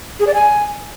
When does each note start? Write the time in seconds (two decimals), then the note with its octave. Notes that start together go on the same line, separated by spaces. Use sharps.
0.20 G#4
0.27 D5
0.34 G#5